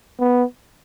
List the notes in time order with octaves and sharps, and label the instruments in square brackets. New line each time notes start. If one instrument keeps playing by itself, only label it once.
[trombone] B3